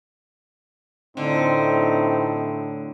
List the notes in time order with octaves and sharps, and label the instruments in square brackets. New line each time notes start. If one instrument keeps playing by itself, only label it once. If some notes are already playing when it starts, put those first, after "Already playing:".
[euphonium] A2 [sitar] D3 [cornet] C4 [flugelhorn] D#4